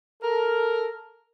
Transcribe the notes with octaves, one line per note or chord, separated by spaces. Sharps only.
A4 A#4